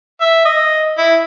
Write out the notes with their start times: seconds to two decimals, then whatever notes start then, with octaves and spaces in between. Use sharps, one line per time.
0.21 E5
0.45 D#5
0.98 E4